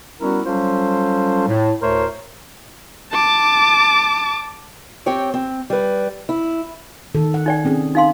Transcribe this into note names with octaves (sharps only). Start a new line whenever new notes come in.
G3 B3 C#4 E4 F#4 A#4
F#3 G3 C#4 F4 A4 C5
A2
D2 A2 A3 A#4 C5 C#5
A5 D6
C4 G4 C#5 G5
C4
G3 B4
E4
D#3 A4
F#5
D#4 D5 G5
C4 C#4 G#4
D#4 F5 C6